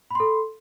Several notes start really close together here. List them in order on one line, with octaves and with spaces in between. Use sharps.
B5 C6 A4